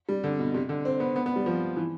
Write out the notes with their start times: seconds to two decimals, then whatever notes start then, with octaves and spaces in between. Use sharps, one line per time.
0.09 G3
0.24 D3
0.39 B2
0.54 C3
0.69 D3
0.85 C4
1.00 B3
1.16 B3
1.26 B3
1.36 G3
1.46 F3
1.77 E3